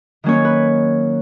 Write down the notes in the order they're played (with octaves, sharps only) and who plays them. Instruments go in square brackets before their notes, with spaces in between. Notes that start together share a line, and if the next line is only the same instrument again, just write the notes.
[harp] D#3 F#3 A#3 C#4 C#5
B4